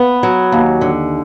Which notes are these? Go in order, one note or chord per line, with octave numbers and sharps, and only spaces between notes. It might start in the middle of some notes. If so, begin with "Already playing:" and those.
Already playing: B3
F#3
D#2
D3